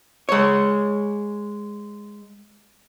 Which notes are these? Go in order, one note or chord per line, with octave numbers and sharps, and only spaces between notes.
G#3 C#5